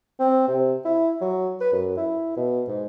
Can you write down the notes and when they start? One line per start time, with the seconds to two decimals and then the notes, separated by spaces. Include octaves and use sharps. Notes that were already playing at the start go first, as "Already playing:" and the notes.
0.19 C4
0.48 C3
0.85 E4
1.21 F#3
1.60 B4
1.72 F#2
1.97 E4
2.37 B2
2.68 G#2